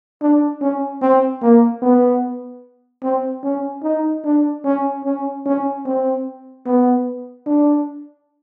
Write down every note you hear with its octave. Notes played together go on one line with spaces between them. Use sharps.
D4
C#4
C4
A#3
B3
C4
C#4
D#4
D4
C#4
C#4
C#4
C4
B3
D4